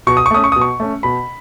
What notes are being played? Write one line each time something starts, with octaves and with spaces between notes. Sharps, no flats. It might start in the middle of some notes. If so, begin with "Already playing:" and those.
B2 C#6
D#6
C#6
A3 C#4 D#6
C#6
B2 D#6
C#6
A3 C#4
B2 B5